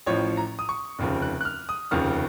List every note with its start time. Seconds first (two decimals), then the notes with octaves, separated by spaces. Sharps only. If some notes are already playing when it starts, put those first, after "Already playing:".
0.07 A1 A2 F3 C#5
0.37 A#5
0.59 D#6
0.69 C#6
0.99 F1 D#2 C#3 F3
1.22 F#6
1.41 F#6
1.45 F6
1.69 D#6
1.91 F1 D#2 C#3 F3 F6